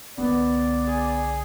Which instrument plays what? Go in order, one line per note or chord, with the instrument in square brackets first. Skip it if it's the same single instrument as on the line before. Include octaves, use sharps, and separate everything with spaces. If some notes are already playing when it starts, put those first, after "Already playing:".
[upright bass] C2 D3 [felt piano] B3 [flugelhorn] D5
[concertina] G#4